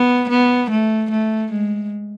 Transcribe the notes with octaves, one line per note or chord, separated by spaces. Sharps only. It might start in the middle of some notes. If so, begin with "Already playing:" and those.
Already playing: B3
B3
A3
A3
G#3